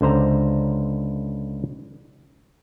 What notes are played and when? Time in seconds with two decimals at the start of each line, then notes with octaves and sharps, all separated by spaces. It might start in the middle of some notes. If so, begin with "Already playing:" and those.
0.01 C#2 D3 C5 A#5